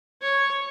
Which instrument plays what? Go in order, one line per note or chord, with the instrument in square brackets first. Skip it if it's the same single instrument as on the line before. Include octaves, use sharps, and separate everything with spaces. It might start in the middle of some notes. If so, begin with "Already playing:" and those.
[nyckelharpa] C#5